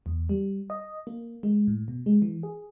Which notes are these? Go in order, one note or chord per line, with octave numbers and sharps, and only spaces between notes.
E2
G3
D#5
A#3
G#3
A2
B2
G#3
E3
G#4